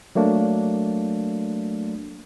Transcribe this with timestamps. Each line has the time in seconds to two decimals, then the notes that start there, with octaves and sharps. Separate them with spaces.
0.15 F#3 A3 A#3 D4